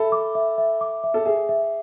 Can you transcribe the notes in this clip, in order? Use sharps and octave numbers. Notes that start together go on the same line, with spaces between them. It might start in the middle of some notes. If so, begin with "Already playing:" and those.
Already playing: A4 E5 B5
D6
E5
E5
D6
E5
A4
G#4 E5
E5